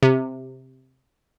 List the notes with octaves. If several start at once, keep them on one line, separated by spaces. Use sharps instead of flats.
C3